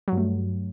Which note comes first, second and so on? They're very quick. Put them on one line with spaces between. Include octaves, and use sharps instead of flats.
F#3 G2 A3